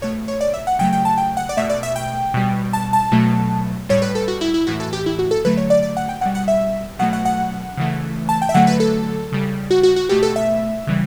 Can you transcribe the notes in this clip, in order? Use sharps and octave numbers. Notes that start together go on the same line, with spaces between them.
B2 A3 C#5
C#5
D5
E5
F#5
C#3 F#3 A3 G5
G5
A5
G5
F#5
D5
B2 A3 E5
D5
E5
G5
B2 G3
A5
A5
B2 F#3 A3
A2 G3 C#5
B4
A4
F#4
E4
E4
A2 E3 A3 F#4
A4
G4
E4
F#4
A4
D3 F#3 A3 B4
C#5
D5
D5
F#5
G5
B2 G3 F#5
F#5
E5
B2 F#3 A3 F#5
F#5
F#5
C#3 E3 A3
A5
G5
E5
D3 F#3 A3 F#5
B4
A4
C#3 G3
F#4
F#4
F#4
B2 A3 G4
A4
E5
C#3 E3 G3